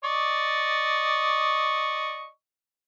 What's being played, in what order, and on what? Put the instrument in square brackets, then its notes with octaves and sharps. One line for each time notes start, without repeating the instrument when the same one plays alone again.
[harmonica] D5 D#5 C#6